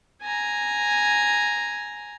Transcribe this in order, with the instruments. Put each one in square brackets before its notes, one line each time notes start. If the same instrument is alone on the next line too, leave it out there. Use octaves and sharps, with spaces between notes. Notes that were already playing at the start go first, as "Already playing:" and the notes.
[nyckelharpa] G#5 A#5